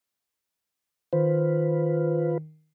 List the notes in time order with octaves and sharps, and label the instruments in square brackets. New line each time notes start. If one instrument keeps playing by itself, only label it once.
[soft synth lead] D#3 [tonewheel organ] F4 B4 [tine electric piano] C5